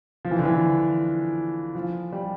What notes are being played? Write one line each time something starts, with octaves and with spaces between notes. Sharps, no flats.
F3
E3
D3
E3
F3
G3